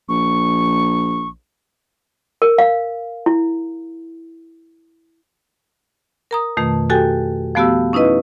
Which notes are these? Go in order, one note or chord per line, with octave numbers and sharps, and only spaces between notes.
A#1 C#6
A#4
F5
E4
A#4 A#5 D#6
F2 B2 D#3 A3
F#4 G4 A4 G5 G#5
F3 A3 B3 F#4 G4 E6
C#4 D#4 E4 B4 D#5